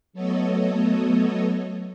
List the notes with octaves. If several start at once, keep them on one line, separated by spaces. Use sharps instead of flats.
F#3 A3 B3 A4 C#5 D#5